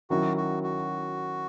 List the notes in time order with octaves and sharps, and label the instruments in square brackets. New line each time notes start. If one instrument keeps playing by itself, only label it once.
[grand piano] D#3 F#3 C#4 E4 [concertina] F#4
[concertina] F#4
F#4